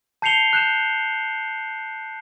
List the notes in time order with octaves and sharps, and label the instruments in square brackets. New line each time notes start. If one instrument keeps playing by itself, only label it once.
[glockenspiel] A5 G6 C7 C#7 F7 G7
F#6 G6 E7